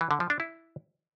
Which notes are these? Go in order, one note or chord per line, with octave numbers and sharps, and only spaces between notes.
E3
D3
F3
D4
E4